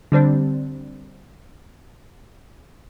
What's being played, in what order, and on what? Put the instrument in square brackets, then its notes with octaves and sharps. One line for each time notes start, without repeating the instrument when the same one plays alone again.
[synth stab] D3 G3 C4 D4